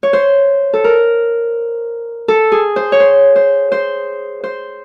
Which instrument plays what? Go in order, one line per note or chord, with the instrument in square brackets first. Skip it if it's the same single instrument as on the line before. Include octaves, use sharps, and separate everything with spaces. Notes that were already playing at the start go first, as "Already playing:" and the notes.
[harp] C#5
C5
A4
A#4
A4
G#4
C5
C#5
C5
C5
C5
C5